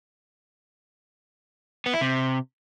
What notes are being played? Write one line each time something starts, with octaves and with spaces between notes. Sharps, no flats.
B3
E4
C3